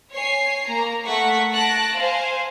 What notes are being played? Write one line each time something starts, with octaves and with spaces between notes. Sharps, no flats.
C#5 G#5 C7
A#3 A#5
A3 F#5 C#6 B6
A5 F#6 A#6 D7
C5 F5 G#5